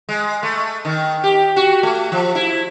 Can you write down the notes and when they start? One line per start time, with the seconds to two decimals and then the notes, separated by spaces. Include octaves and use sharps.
0.09 G#3
0.43 A3
0.85 D#3
1.24 G4
1.56 F#4
1.83 A3
2.12 F3
2.35 E4